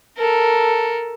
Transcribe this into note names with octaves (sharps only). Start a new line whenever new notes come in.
A4 A#4